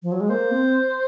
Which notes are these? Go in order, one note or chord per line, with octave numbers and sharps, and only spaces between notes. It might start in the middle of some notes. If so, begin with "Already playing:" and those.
F3
F#3
G#3
A#3 C5
C4